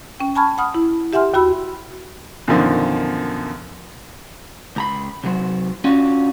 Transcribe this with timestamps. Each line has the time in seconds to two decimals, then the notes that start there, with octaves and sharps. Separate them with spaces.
0.20 C#4 G5
0.35 G#5 A5 B5 C#6 F6 G#6
0.58 F#5 B5 D#6 F6
0.74 E4
1.13 G4 E5 F#5 G#5 C6 F6
1.34 D#2 F#4 B5 E6
2.48 F#2 B2 D3 D#3 F3
4.76 C#2 A#5 B5
5.24 C3 F#3 C5
5.84 C#4 D4 F4 F#4